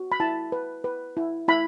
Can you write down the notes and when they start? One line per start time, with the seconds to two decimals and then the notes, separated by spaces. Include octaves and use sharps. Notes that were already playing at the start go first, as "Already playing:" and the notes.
Already playing: F#4
0.12 B5
0.20 E4 A5
0.52 B4
0.84 B4
1.17 E4
1.48 E4 B5